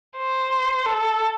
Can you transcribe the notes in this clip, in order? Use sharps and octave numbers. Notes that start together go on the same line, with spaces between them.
C5
A4